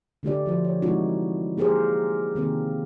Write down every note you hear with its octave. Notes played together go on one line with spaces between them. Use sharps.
D3 A3 G4 D5
F3 F#4 C5
C#5
E3 G#3 C4 D#4 E4 F#4
A#3 G4 G#4 A#4 C5
D#3 A#3 C4 A#4